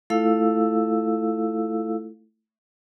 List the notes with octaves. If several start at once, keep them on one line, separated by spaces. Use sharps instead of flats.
A3 E4 F4 A4 F5 E6